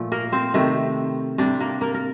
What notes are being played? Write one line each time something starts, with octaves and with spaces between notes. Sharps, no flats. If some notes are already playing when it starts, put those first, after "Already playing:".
Already playing: A#2 F3 A3
A#3 A#4
C4 C5
C3 D#3 A3
C3 G3 D4 D5
A#3 A#4
A#3 A#4
A#4